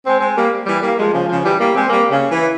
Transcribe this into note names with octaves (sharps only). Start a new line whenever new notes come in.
G#3 C4
G#3 C4
G3 A#3
E3 G3
G3 A#3
F3 G#3
C#3 F3
C#3 F3
E3 G3
G3 A#3
G#3 C4
G3 A#3
C#3
E3